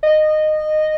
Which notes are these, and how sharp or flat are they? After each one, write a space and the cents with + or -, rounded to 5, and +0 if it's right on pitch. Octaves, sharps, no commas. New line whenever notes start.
D#5 -15